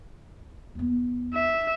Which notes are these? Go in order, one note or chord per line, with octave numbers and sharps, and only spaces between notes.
E2 B3
E5